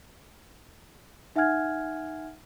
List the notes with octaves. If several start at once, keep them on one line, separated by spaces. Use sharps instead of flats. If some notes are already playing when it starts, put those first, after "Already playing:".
D#4 E5 F#5 G#5 F6 G#6